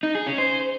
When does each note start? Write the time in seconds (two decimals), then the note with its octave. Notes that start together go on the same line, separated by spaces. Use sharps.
0.03 D#4
0.15 G#4
0.26 C#4
0.38 C5